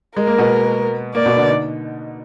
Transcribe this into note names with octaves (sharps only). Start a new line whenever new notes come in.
G#3 A#4
A#3
B2 B3
A#3 D5
B2 B3
D3 D4
D#4